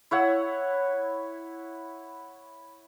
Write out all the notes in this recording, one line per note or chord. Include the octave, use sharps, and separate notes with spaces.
E4 C#5 F#5 E6